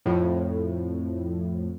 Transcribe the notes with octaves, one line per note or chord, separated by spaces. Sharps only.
F2 A2